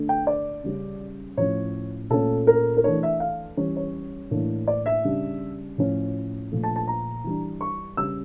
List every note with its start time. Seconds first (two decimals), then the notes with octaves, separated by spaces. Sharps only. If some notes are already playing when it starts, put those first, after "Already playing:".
Already playing: D3 A3 D4
0.09 G5
0.27 D5
0.64 C#3 G3 C#4
1.37 A2 F3 C#4 C#5
2.10 A#2 A3 C#4 A4
2.47 A#4
2.77 A#4
2.83 E3 A3 D4 C#5
3.03 E5
3.20 F5
3.57 E3 G3 C#4 C#5
3.76 C#5
4.31 A2 E3 A#3 D4
4.67 D5
4.86 E5
5.04 C#3 G3 D4
5.78 A2 F3 C#4
6.51 A#2 F3 A3
6.63 A5
6.76 A5
6.88 A#5
7.24 E3 G3 D4
7.61 C#6
7.97 C#3 G3 C#4 E6